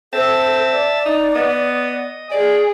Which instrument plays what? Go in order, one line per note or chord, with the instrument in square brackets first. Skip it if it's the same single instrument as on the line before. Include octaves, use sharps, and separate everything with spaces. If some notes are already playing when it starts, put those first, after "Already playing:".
[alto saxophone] C4 [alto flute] A4 [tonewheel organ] E5 A5
[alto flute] D5
[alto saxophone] D#4
[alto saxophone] B3 [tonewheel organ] D#5
[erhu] G#4 [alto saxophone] D5